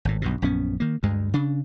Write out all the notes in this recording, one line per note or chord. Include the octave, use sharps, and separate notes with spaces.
G#1 A2
B1 G2 B2
A#1 F#2 B3 C#4
D#3 A#3
D2 G2 G#3
C#3 D4